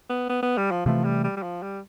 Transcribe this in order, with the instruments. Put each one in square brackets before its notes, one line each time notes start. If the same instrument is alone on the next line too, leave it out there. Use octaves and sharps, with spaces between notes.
[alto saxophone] B3
B3
B3
G3
F3
[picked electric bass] C3 E3 A3 [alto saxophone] F3
[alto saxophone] G3
G3
G3
F3
G3